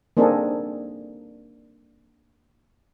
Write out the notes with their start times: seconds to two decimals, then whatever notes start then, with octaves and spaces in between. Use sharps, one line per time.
0.17 A#3 C4 D4 D#4 G#4 A4